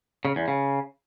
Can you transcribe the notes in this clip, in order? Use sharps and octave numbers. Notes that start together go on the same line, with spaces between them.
C#3
E2
C#3